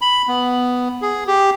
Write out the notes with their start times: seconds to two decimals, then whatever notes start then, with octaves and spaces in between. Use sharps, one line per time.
0.01 B5
0.28 B3
1.02 G#4
1.27 G4